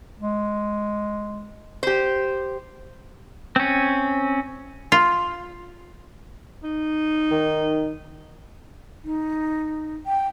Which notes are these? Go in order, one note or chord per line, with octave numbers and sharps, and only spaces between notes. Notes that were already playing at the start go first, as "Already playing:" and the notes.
G#3
G4 C5
C4 C#4
F4
D#4
D#3
D#4
G5